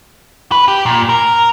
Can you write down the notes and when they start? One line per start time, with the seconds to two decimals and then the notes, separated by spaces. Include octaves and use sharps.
0.52 B4
0.68 G4
0.86 A#2
1.09 A#4